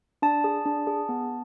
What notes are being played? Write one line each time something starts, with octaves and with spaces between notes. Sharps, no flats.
D4 A5
G#4
D4
G#4
B3